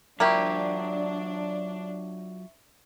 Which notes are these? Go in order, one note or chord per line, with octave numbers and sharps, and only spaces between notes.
F#3 A#3 D4 E4 F4 G4 E5 C#6